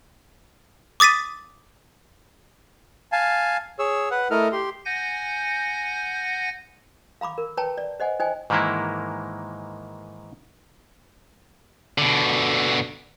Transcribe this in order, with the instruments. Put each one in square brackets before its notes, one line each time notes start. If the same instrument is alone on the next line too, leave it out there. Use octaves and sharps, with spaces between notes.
[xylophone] D6 D#6 A6 B6 D#7
[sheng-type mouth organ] F5 G#5 A5
G#4 C#5 E6
B4 F#5
A3 E4 A4 A#4 D#5 F6
G4 C6
[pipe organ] F#5 G#5 G6 A#6
[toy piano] F5 A#5 B5 D6
A#4
B4 C#5 G5 A5 A#5
D5
C5 D#5 F#5 G#5
D#4 C5 D#5 G5 G#5
[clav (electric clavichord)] G#2 D#3 E3 G#3 A#3 E4
[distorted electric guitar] B2 D3